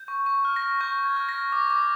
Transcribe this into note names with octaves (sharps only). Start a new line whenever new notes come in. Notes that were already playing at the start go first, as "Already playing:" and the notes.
Already playing: G6
C#6
C#6
F6
A#6
F6
C#6 G6
C#6
G#6
F6
A#6
F6
D6
D6